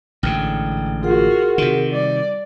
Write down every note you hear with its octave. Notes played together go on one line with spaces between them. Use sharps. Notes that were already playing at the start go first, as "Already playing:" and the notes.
A1 G#2 D3 G5
F4 F#4 G#4 A#4 F#5
C3 D#3
G3 D5